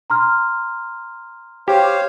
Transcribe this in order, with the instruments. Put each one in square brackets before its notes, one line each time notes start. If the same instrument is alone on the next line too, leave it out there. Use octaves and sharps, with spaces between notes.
[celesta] A#5 C6 F6
[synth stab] G4 [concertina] C5 C#5 F5